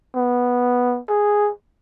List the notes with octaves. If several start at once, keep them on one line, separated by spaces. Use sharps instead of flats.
B3
G#4